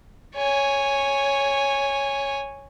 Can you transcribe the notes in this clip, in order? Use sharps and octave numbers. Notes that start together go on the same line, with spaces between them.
C#5 G#5